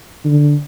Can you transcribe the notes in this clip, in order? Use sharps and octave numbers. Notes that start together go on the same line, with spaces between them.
D3